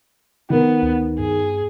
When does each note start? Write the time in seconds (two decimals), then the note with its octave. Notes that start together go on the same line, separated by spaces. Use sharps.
0.50 D#3 B3 A#4
0.83 D2
1.19 G2 G#4